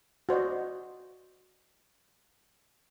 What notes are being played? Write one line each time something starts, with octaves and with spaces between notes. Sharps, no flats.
F#4 C5 D5 D#5